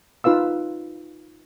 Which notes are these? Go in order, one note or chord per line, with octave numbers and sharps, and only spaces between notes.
D#4 F4 B4 F5 E6